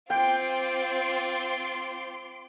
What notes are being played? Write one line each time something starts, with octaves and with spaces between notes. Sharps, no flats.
C4 F4 G5 C6 D6